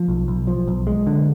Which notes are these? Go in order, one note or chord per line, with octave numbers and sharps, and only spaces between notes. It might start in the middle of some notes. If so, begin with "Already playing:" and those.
Already playing: F3
B1
B1
F3
B1
G#3
D3